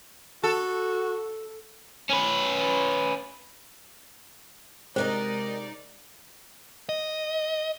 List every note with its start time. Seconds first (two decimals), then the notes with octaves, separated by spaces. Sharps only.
0.44 F#4 A4
2.09 C#4 B4
4.96 C3 G#3 D#4 G4 A#4 C5 D5 D#5
6.89 D#5